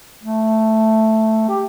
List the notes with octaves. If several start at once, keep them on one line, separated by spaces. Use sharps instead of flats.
A3
G4